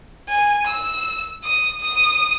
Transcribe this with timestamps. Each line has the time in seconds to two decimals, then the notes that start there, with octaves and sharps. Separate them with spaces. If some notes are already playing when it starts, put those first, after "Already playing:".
0.29 G#5
0.67 E6
1.44 D#6
1.81 D#6